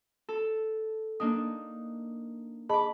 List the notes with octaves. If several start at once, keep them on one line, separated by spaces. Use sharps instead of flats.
A4
A#3 D4 D#4 D#6
G#4 D#5 A5 B5 D6